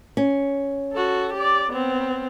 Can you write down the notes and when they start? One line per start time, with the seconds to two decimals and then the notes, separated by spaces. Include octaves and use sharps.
0.17 C#4
0.93 F#4 A4
1.34 G4 D5
1.71 B3 C4